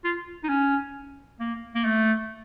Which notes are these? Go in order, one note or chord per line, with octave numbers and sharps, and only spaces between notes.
F4
D#4
C#4
A#3
A#3
A3